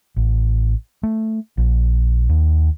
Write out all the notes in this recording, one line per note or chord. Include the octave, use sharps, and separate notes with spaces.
A1
A3
A#1
D#2